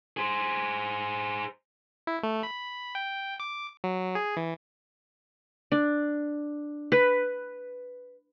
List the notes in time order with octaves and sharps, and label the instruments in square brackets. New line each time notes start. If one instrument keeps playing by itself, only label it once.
[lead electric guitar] G#4 C5
[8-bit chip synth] E4
A3
B5
G5
D6
F#3
G#4
E3
[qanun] D4
B4